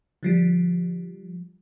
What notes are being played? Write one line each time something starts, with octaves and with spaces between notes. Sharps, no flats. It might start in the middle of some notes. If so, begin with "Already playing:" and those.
D3 F3 G3